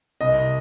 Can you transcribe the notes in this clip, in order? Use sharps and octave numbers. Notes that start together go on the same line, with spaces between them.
C2 D#5